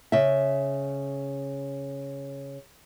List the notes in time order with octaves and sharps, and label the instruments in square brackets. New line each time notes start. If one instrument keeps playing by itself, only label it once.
[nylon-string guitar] C#3 E5